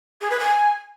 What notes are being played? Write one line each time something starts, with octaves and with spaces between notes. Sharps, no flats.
G#4
B4
G#5